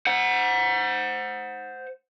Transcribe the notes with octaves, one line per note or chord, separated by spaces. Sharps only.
C5 F#5